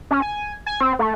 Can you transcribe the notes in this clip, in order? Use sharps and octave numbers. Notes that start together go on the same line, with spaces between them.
C#4
G#5
G#5
C4
A3